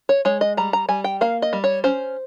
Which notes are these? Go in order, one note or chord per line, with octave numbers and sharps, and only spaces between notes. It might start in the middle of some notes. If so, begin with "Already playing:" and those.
C#5
G#3 C#5
D#5
G3 A#5
A#5
G3 G#5
G5
A#3 F5
D#5
G3
C#5
C#4 C5